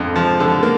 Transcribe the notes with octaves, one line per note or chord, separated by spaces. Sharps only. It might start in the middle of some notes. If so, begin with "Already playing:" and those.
Already playing: F2 D3
F3
D3 A4
A#3